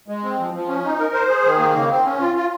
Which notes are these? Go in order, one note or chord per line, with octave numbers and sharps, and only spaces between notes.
G#3
C4
F3
F3
C#4
D#4
A#4
C5
G#4
D#3
A#3
C#3
C4
C#4
F4
F4